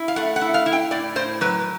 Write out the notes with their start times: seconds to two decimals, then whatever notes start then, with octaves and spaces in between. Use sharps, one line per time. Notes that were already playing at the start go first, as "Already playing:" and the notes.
Already playing: E4
0.08 F5
0.16 A3 F#5
0.36 F#5
0.41 E4
0.54 F5
0.66 E4
0.73 G5
0.91 A2 D5
1.16 A2 C5
1.41 F#3 B4